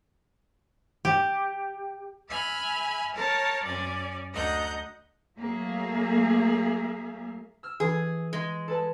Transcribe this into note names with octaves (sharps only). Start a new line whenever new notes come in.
G4
E5 G#5 B5 F6
A#4 C#5 A5
F#2 C#4 D5 G#5
D2 D#5 F#5 A#5 G6
F#3 A3 A#3 G#4 E5 F5
E6 F6
E3 G#4
G#3
A4 B4 A5